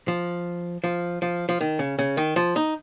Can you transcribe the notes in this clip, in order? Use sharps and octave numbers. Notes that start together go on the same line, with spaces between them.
F3
F3
F3
F3
D#3
C#3
C#3
D#3
F3
D#4